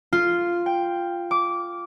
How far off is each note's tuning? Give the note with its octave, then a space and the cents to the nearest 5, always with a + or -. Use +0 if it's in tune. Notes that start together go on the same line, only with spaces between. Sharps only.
F4 -5
G5 +5
D6 -15